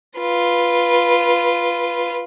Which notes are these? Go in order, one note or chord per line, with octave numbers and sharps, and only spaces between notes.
F4 B4